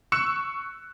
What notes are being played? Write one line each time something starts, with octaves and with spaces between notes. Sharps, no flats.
C#6 E6 F#6 C#7 E7